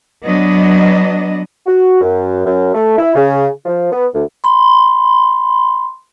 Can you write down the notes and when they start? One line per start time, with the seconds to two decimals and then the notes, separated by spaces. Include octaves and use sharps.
0.25 F#3 B3 D4 D#5
1.67 F#4
2.01 F#2
2.46 F#2
2.74 A3
2.97 E4
3.15 C#3
3.65 F3
3.91 B3
4.13 D2
4.44 B5 C6